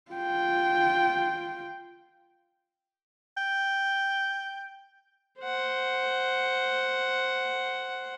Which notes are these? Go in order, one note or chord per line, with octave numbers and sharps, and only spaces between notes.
F4 G5
G5
C5 F#5